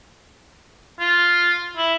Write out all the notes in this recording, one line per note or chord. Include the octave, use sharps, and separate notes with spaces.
F4
E4